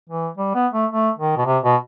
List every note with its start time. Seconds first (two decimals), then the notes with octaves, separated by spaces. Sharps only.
0.10 E3
0.37 G3
0.55 B3
0.73 A3
0.91 A3
1.19 D#3
1.37 B2
1.46 C3
1.63 B2